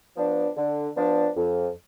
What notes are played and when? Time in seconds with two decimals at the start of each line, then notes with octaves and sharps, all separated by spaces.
0.16 F3 B3 D4
0.56 D3
0.96 F3 B3 D4
1.36 F2